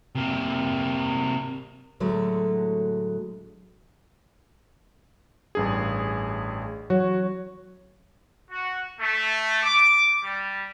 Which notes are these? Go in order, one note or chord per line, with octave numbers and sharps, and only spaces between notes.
C3 A#3
A2 D3 F#3 G#3 A3
A1 G2 G#4
E3 F#3 F#4 C#5
F#4
A3
D6
G3